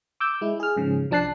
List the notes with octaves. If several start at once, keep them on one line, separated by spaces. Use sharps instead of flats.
D6 E6 G6
G#3 E4
G#4 F6
G#2 C#3 F3
C2 F3 D4 A5 F#6 C7